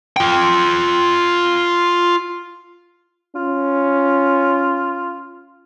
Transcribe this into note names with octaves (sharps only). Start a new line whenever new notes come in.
F4 G5
C#4 F4